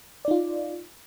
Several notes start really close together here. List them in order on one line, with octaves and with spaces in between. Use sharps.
D5 D#4 F4